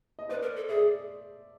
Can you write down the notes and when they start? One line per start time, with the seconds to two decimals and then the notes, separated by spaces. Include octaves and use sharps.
0.19 D#5
0.29 B4 C5 D5
0.42 A#4
0.56 A4
0.69 G#4 D5 E5